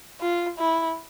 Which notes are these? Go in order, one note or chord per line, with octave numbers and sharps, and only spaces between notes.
F4
E4